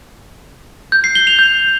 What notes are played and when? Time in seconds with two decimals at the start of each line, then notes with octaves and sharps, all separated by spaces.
0.92 G6
1.04 C7
1.15 G7
1.27 F7
1.39 G6